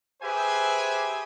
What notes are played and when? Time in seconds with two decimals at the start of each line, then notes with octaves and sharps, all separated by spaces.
0.22 G4 G#4 B4 C5 E5 G#5